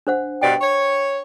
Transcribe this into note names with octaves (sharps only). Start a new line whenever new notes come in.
D4 C5 F#5
G2 B2 D5 G5
C#5